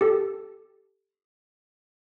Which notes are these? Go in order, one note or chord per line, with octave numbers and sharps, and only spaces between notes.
G4 A4